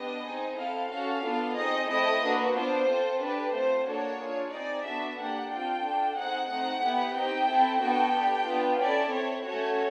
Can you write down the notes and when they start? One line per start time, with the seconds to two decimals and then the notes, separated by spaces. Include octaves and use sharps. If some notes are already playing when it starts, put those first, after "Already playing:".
Already playing: B3 D4 G4 D#5
0.25 C4 D#4 G#4
0.58 C4 E4 A4 F5
0.91 C#4 F#4 A4 F5
1.24 B3 D4 F4 A4
1.57 C4 D#4 G#4 D#5
1.90 A3 C4 E4 A4 D#5
2.23 A#3 D4 F#4 B4
2.55 B3 D4 F4 C5
2.88 C4 F4 A4
3.22 D4 G4 B4
3.55 A3 C4 F4 C5
3.87 A#3 D4 F#4 A4 C#5
4.20 D4 F4 G#4
4.53 C4 D#4 G#4 D5
4.86 B3 D4 F#4 A4 E5
5.19 A#3 D4 G4 F#5
5.52 C4 F4 A4 G5
5.85 D4 F4 A4
6.17 C4 D#4 G#4 F#5
6.51 A3 C4 D#4 F#5
6.84 B3 E4 G4
7.16 C4 D#4 G4 G5
7.49 C4 E4 A4
7.82 B3 D4 F#4 A4 G5
8.15 D4 G4
8.48 B3 D4 F4
8.81 C#4 E4 A4 D5
9.14 C4 E4 A4 C#5
9.47 A3 C#4 F#4 A4 C#5